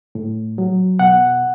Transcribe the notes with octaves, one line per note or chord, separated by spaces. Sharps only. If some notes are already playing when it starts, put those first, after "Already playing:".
A2
F#3
B2 F#5